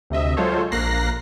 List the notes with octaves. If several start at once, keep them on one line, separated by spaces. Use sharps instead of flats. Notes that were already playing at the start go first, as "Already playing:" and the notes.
D2 C3 D#5 E5
F#3 G#3 F4 A4 C5 C#5
A#1 A#3 A#4 F#6 A#6 C7